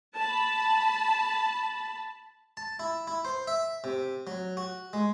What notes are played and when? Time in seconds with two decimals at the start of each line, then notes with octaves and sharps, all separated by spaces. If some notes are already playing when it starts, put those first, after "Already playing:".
0.15 A5 B5
2.57 A5
2.79 E4
3.07 E4
3.25 C5
3.47 E5
3.84 C3
4.27 F#3
4.57 F#4
4.93 G#3